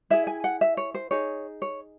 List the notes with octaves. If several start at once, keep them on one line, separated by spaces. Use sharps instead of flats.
E4 G#4 E5
G#5
F#5
E5
C#5
C5
D#4 G#4 C#5
C#5